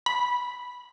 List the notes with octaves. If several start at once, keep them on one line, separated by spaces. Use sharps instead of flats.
B5